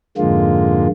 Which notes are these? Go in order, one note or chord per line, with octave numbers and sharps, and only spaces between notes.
F2 G#2 D3 G#3 A#3 F4